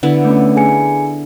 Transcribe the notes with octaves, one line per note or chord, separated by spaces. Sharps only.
D3 B3 E4
A3 C#4
G#4 G#5 C#7